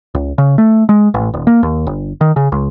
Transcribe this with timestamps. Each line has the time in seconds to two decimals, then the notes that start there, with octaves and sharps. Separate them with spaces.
0.15 C#2
0.38 C#3
0.58 A3
0.89 G#3
1.14 A1
1.34 D#1
1.47 A#3
1.63 D#2
1.87 G1
2.21 D#3
2.36 C#3
2.52 C#2